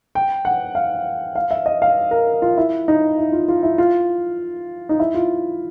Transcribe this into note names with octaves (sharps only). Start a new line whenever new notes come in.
G5
F#5
F5
F5
E5
D#5
F5
A#4
F4
E4
D#4
E4
F4
F4
E4
F4
D#4
E4
F4